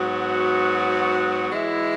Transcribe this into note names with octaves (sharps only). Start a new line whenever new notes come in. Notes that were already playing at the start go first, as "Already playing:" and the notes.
Already playing: G#2 F#3 B3 F#4
E3 G#3 E4